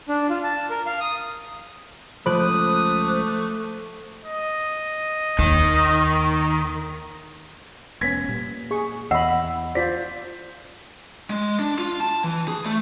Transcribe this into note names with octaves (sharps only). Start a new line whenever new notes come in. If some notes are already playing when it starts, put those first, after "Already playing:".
D4
F4
A5
A#4
F5
D#6
C#2 F3 A3 C5 B5 D6 D#6 F#6
D#5
D#2 D#3
F1 B3 C#4 G#6 B6
A#2 G3
G#4 C#6
E2 D#5 E5 F#5 B5 E6
F4 C5 D5 B6
G#3
D4
F4
A5
E3
G#4
A3